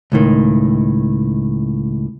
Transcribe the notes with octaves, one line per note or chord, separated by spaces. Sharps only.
C#2 A2 D#3